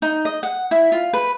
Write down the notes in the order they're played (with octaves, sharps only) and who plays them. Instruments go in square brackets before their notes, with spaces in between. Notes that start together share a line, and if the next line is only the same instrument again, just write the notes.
[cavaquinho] D#4
D#5
F#5
E4
F4
B4